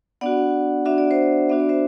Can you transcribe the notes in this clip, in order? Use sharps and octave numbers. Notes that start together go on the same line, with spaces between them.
B3 D4 F#4 D5 F#5
B3 D4 F#4 E5
D5
C5 E5
B3 D4 F#4 E5
D5
C5 E5